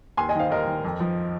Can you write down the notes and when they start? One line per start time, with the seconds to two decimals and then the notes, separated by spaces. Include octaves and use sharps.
0.17 D#2 G#5 C6
0.29 D#5 G#5
0.35 D#3 C5 F5
0.50 D#2 A#4 D#5
0.67 D#3
0.85 F2
1.00 F3